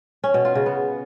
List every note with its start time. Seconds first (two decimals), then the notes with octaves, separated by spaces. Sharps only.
0.24 C#4
0.34 B2
0.45 F4
0.55 C#3
0.66 B3